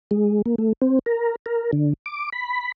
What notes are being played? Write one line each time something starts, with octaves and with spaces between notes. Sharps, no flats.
G#3
A#3
A3
C4
A#4
A#4
D3
D6
B5